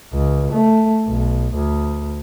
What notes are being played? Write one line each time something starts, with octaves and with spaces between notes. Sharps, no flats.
C#2
A3
B1
D2